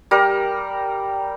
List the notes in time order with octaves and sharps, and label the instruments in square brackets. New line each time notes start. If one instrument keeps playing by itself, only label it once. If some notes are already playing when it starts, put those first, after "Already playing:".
[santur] G3 A#4